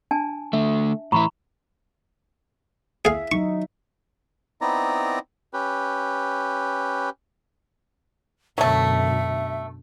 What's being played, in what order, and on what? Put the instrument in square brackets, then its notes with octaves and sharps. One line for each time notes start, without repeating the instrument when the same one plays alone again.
[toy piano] D4 G#5 A5
[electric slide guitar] D3 A3 [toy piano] E5
[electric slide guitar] A2 E3 E4 [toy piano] A#5 B5 C#6
[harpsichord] G#4 F5 [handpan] E5
[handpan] F#3 D#4 [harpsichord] C#6
[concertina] B3 C4 D#4 E4 D5 A#5
C#4 G4 B4
[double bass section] F#2 B2 D3 [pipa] F#3 A3 [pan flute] E5